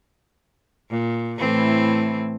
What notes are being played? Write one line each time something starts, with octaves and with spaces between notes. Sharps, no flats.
A#2
A2 E3 C4